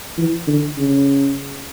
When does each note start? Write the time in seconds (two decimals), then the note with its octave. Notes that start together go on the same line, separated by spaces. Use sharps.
0.18 E3
0.47 D3
0.78 C#3